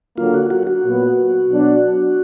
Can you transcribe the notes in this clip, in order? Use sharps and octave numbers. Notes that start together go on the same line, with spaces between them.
D3 F#3 A#3 F4
F#4
F#4
F#4
A#2 F#3 B3
B2 F#3 D4